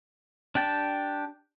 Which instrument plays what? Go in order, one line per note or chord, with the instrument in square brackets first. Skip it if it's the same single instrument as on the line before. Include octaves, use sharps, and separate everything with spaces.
[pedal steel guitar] D4 G4 G5 A5